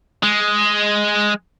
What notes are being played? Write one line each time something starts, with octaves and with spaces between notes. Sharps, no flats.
G#3